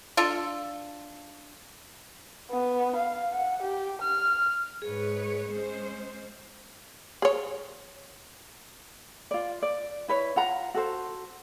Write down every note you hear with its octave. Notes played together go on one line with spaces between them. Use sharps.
D4 F4 A4
B3
F5
F#5
G4
F6
G#2 G#4 B4 C#5
G#3 C#4 C5
G#4 C#5
F4 D5
D5
E4 B4 C#5
F4 F#5 A#5
F#4 A4 C5